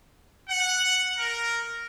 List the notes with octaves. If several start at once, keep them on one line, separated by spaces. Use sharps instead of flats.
F#5
A#4